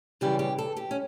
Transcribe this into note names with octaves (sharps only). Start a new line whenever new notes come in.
F#2 C#3 E3 G3 G4
G4
A4
G4
C#4